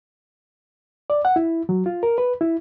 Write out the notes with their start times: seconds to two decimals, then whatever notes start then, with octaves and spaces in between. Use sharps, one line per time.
1.10 D5
1.25 F#5
1.36 E4
1.69 F#3
1.86 F4
2.03 A#4
2.18 B4
2.41 E4